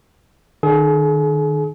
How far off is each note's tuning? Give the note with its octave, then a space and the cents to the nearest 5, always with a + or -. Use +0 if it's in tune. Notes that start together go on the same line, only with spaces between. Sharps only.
D#3 -35 G#4 +40